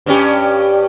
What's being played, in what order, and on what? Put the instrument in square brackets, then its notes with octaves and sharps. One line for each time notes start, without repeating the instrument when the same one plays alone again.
[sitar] G2 C#4 G4